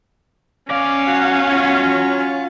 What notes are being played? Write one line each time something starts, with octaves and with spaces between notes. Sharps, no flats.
E2 C#4 D5 F5
F#3 F#5
F#3 F4